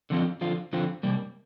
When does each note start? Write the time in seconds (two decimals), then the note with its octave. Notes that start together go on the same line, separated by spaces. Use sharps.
0.10 D3 F3 C4 F4
0.41 D3 F3 C4 F4
0.73 D3 F3 C4 F4
1.03 C3 G3 A#3